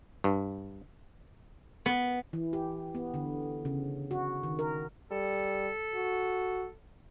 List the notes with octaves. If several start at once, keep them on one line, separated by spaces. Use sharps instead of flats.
G2
B3
E3
G4
B3
D3
C#3
F#4
D#3
A#4
G3 A4
F#4